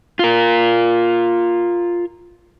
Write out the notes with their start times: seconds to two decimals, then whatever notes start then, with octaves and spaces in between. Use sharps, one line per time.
0.19 F4 A#4